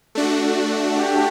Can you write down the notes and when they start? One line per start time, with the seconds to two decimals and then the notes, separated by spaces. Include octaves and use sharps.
0.15 A3 D4 F#4
0.99 G4